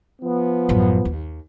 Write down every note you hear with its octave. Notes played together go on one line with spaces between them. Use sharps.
F3 B3
A1 F#2
D#2